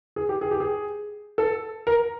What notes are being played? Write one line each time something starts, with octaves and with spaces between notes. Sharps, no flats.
G#4
G4
G#4
G4
G#4
A4
A#4